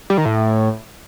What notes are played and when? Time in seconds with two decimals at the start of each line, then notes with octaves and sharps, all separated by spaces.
0.10 G3
0.18 D#3
0.25 A2